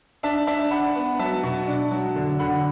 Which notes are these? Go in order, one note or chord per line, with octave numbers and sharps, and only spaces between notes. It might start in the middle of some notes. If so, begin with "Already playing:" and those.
D4 E5 A5
D4 E5 A5
D4 F#5 B5
B3
F#3 E5 A5
B2
D4
F#3
D3
D3 F#5 B5